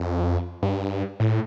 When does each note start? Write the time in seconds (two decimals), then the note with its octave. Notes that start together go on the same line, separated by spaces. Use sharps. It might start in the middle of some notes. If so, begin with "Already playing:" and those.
Already playing: F2
0.63 G2
1.20 A2